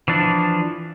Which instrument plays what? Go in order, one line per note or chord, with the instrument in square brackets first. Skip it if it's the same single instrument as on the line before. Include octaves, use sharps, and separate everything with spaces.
[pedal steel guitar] E3 F3 D4